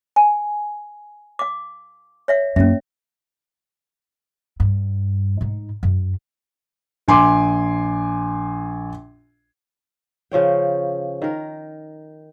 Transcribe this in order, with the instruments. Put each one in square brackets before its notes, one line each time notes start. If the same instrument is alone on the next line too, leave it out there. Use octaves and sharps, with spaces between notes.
[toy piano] G#5
F5 D6
C#5 E5 F5
[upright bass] F#2 A#3 [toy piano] C#4 E5
[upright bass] G2
G#2 D#4
F#2
[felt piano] A#1 G#5 C6 D6
[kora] C#3 F3 C#5 G5
D#3 A#4